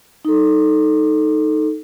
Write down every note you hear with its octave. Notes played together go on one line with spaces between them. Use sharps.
D#4 A4